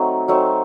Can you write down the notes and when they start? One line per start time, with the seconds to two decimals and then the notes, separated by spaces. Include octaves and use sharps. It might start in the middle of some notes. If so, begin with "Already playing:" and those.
Already playing: F#3 A3 C4 D#4
0.28 F#3 A3 C4 D#4